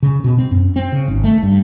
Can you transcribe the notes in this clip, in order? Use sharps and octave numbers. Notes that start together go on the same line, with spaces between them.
C#3
B2
C4
F#2
C4
C#3
G#1
A3
G2